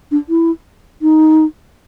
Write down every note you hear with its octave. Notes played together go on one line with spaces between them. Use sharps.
D4
E4
D#4